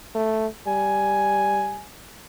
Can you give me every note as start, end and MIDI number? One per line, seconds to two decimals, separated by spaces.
0.15 0.47 57
0.67 1.81 55
0.67 1.84 80